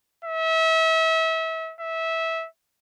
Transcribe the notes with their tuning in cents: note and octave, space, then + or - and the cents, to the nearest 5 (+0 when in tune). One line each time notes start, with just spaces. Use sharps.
E5 -30
E5 -15